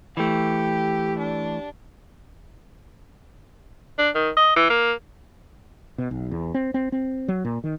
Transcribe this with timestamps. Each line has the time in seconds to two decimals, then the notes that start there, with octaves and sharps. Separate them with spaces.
0.17 E3 A3 G4
1.19 D4
3.98 D4
4.15 D#3
4.37 D#5
4.56 E3
4.70 A#3
5.98 B2
6.11 B1
6.31 E2
6.54 C4
6.74 C4
6.92 C4
7.28 F#3
7.45 A#2
7.64 D#3